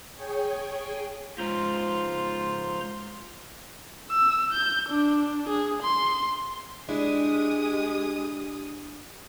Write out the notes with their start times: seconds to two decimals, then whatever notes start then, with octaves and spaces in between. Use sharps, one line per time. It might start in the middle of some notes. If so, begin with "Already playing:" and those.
0.14 G#4 C#5 G5 G#5
1.38 C#2 G#2 F4 C5 A#5 C6
4.10 E6
4.53 G6
4.89 D4
5.49 G#4
5.83 C6
6.89 G#3 D4 E4 G4 G#4 D#6